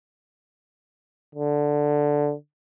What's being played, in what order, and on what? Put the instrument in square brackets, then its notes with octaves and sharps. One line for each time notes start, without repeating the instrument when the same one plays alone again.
[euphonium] D3